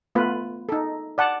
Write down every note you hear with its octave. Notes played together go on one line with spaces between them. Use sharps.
A3 B3 F4 B4
D#4 A4
D5 F#5 A5